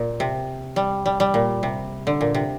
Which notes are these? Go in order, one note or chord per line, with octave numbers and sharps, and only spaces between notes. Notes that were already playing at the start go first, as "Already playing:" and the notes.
Already playing: A#2
C3
G3
G3
G3
A#2
C3
D3
A#2
C3